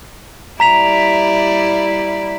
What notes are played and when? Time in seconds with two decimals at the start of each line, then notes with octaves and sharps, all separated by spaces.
0.60 G3 E4 D5 A#5 B6 F7